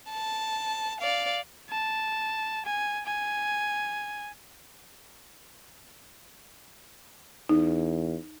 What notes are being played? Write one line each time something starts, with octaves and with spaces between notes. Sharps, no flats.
A5
D5 F5
A5
G#5
G#5
E2 D#4